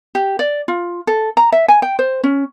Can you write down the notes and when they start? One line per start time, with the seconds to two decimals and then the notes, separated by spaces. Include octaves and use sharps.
0.15 G4
0.39 D5
0.68 F4
1.07 A4
1.37 A#5
1.52 E5
1.68 G#5
1.82 G5
1.99 C5
2.24 C#4